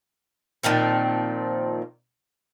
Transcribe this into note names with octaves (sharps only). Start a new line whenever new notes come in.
A#2 D#3 F3 C4